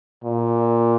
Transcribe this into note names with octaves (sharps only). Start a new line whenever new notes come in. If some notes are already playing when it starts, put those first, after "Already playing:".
A#2